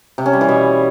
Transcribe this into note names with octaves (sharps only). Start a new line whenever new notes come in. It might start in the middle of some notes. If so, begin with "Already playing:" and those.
C3
C#4
G3
E3
B2